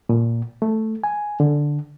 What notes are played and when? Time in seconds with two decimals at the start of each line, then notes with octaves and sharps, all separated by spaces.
0.09 A#2
0.62 A3
1.04 G#5
1.40 D3